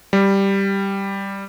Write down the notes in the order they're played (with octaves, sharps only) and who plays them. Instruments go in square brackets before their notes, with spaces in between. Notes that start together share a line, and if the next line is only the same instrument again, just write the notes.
[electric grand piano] G3